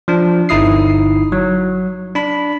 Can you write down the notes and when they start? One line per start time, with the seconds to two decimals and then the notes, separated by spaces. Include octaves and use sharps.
0.08 F3 D4
0.49 G1 D#4 E4 D#6 C7
1.32 F#3
2.15 D4 B5